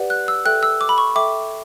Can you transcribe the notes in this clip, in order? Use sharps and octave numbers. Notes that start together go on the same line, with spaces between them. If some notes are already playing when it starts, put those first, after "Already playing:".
Already playing: G4 B4 D5 F#5
F#6
E6
A4 E5 G5 F#6
E6
D6
B5
C#6
A4 E5 G5 D6